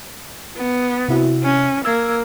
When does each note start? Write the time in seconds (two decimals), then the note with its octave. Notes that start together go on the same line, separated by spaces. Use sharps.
0.56 B3
1.08 C3 E4 F#4
1.44 C#4
1.85 A#3 E6 G#6